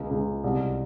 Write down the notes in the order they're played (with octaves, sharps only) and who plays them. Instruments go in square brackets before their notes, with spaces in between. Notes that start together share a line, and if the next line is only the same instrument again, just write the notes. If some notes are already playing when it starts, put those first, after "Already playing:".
Already playing: [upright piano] C#2 B3
C#2
C2